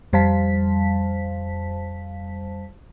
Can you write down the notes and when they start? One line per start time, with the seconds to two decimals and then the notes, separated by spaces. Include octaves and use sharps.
0.13 F2 G3 C5 F5 A5 B6